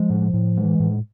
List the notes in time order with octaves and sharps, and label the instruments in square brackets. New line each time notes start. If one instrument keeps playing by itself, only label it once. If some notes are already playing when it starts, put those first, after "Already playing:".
Already playing: [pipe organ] F3 [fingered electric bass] G#3
[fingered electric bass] A2
A2
[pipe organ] E3 [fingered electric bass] G#3
[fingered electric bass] A2